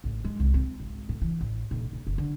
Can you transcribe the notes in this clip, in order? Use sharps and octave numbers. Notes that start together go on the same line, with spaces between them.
A1
G#3
C2
C4
G#1
A2
E3
A1
D#1
D#1
F#1
D3